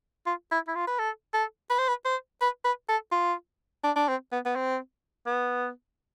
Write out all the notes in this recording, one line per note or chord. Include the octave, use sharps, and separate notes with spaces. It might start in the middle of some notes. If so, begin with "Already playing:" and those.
F4
E4
E4
F4
B4
A4
A4
B4
C5
B4
C5
B4
B4
A4
F4
D4
D4
C4
B3
B3
C4
B3